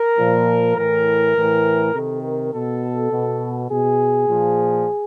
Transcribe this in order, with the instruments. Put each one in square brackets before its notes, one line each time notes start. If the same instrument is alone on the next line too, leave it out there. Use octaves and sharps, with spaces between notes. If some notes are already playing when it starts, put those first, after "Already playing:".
Already playing: [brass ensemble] A#4
A#2 F3
A2 E3 A#4
A2 E3
C3 D#3 A4
A#4
B2 A4
B2
B2 G#4
A#2 F3